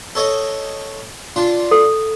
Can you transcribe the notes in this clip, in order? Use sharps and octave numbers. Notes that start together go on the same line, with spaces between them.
A4 C#5 D#5
D4 F4
A4